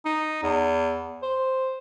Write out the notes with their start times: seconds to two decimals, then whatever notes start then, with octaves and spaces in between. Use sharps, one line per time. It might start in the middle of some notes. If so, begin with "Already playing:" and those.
0.05 D#4
0.43 E2
1.22 C5